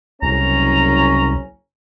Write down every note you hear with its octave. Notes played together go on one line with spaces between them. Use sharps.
F#1 C2 C#4 A#5